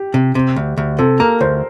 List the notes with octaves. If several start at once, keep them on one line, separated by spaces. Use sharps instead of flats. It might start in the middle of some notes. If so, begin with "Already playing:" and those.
Already playing: G4
C3
C3
D2
D2
C3 A4
A#3 A#4
D2 C5